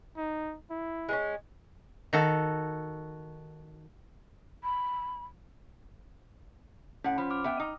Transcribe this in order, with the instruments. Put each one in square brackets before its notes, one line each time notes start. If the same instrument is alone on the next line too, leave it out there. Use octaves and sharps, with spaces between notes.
[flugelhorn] D#4
E4
[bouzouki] G#3 B3 C#4
[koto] D#3 F#4 A4
[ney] B5
[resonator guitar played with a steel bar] A2 F#5 [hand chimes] C#4
[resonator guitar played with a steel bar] F3 [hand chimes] B5
[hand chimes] D6 F6
[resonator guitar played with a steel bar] B3 E5 G5
D#4